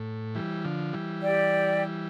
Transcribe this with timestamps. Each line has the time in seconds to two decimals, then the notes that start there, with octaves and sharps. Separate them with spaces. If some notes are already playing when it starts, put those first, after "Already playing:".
Already playing: A2
0.35 E3 G3
0.65 D3 F3
0.93 E3 G3
1.22 G4 D5 G5